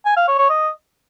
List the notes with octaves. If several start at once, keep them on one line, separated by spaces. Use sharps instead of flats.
G#5
F5
C#5
C#5
D#5